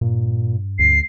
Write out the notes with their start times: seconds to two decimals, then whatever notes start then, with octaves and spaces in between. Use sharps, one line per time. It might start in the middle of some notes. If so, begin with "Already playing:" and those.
0.01 G2 A#2
0.79 D2 C7